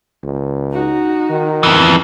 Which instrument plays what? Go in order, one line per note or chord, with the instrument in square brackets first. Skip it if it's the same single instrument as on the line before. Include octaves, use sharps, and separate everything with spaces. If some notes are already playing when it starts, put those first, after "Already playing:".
[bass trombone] C#2
[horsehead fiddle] D#4 F#4
[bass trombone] D#3
[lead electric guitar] F2 E3